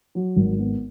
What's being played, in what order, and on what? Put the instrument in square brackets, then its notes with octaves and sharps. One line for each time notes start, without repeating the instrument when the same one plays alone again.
[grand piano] F#3
G#1
B3